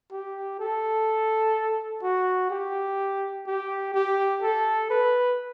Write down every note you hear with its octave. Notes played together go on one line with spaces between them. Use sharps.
G4
A4
F#4
G4
G4
G4
A4
B4